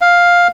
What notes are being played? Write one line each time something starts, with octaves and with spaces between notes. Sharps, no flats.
F5